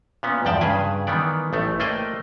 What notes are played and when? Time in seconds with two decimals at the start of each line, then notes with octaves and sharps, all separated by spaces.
0.23 A#2 B3 C#4
0.45 E2 G2 F3 D5 G5 A5
0.61 G2 C#3 G#4 B4 G#5
1.07 D#3 E3 B3 D5
1.53 A1 A3
1.80 A3 A#3 C5 D5 D#5 G5